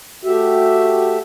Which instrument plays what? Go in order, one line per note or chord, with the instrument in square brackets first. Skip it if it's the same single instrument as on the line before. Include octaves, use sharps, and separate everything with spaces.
[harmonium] A3 G4 E5 [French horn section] F#4